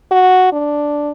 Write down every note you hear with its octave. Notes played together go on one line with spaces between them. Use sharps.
F#4
D4